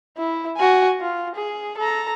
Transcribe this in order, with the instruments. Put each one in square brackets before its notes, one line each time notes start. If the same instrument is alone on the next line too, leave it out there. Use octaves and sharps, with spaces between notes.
[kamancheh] E4
F#4 G#5
F4
G#4
A4 A#5